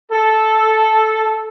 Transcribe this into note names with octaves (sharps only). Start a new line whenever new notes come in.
A4